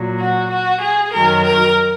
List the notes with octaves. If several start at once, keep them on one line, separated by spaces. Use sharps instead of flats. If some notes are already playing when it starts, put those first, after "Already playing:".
Already playing: A#2 F#3
F#4
F#4
G#4
F#2 D#3 F#3 A#4
A#4